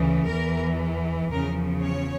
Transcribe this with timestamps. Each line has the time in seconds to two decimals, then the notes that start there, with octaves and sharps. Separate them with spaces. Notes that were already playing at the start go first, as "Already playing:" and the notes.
Already playing: D2 C#3 E3
0.26 E2 E3 A#4
1.31 E2 C#3 F3 A#4
1.83 C#5